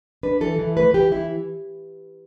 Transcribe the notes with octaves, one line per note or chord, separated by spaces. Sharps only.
D4 B4
E3 A4
E3
A3 B4
E3 G4
E3 E4